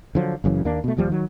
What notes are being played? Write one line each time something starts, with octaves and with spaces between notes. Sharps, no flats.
D3 F3 F#3
F#1 F#2 C#3 E3
D#2 A#3 D4
B2 A3
D#1 D#2 F3 G3
D#3 F#3